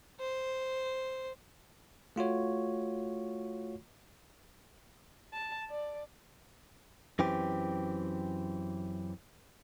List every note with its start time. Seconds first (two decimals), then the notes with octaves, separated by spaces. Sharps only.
0.20 C5
2.16 A3 F4 F#4 C#5
5.33 A5
5.70 D5
7.19 F#2 E3 C4 G4